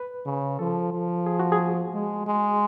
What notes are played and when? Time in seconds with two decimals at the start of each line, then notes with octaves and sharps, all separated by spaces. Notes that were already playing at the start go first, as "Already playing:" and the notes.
Already playing: B4
0.26 C#3
0.59 F3 A4
0.93 F3
1.26 G#4
1.40 F#4
1.52 G#4
1.94 G#3
2.27 G#3